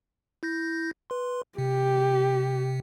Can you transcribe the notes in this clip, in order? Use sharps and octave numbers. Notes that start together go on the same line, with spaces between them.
E4 G6 A#6
B4 C6
C3 G4